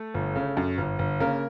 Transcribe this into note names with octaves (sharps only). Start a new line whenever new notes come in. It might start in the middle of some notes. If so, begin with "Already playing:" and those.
Already playing: A3 A4
G1
C#3
F#2
G1
G1
C#3 A#3 A#4